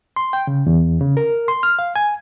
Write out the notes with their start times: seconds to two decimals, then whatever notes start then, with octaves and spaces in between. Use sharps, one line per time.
0.16 C6
0.33 G5
0.47 C#3
0.67 E2
1.01 C#3
1.17 A#4
1.48 C6
1.63 F6
1.79 F5
1.96 G#5